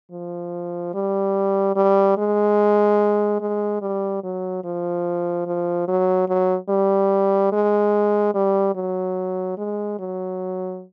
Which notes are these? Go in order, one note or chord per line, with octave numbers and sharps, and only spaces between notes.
F3
G3
G3
G#3
G#3
G3
F#3
F3
F3
F#3
F#3
G3
G#3
G3
F#3
G#3
F#3